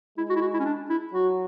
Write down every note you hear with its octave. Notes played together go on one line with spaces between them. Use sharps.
G#3 E4
F#4
E4
F#4
E4
C#4
D4
E4
F#3 F#4